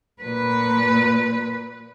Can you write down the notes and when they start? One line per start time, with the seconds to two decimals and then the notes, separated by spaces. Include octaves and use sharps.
0.23 A#2 B4